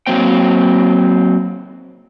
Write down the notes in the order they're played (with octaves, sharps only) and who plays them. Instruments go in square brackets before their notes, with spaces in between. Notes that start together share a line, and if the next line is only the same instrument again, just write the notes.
[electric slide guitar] F#3 A#3 C4 G5